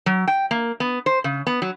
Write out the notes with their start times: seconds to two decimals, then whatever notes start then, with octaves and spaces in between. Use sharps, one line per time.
0.06 F#3
0.27 G5
0.51 A#3
0.80 B3
1.06 C5
1.24 C#3
1.47 B3
1.62 F#3